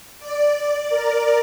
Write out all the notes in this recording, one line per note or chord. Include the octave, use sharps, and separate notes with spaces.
D5
A#4